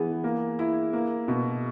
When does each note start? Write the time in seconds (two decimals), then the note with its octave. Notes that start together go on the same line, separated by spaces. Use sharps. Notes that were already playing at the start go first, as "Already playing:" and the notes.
Already playing: E3 B3 G#4
0.24 A#3
0.59 E4
0.93 A#3
1.28 B2